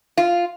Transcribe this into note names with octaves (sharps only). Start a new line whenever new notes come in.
F4